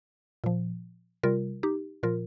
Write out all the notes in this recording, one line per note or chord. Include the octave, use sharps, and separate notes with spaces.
A#2 F3
C3 G3 F4 A#4
D#4 G4
A#2 F3 F4 A#4